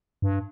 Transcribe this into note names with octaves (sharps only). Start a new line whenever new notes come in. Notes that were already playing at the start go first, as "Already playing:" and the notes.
G2